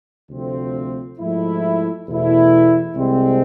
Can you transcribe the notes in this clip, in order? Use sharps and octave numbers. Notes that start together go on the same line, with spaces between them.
D2 C3 F3 A3 C4
G#2 F3 A3 E4
E2 B2 A3 E4
C2 C3 G#3 C4